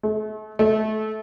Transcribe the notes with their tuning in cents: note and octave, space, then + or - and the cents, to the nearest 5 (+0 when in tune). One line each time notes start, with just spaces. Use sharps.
A3 -40
A3 -25